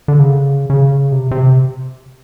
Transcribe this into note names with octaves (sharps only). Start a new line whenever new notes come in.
D3
C#3
C#3
C3
C3